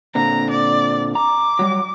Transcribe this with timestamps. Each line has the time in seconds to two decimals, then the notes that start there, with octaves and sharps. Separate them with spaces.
0.15 A#2 D3 C4 A#5
0.51 D5
1.15 A#5 D6
1.59 F#3 G3